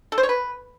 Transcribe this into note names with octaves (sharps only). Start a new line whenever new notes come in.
A4
C5
C#5
B4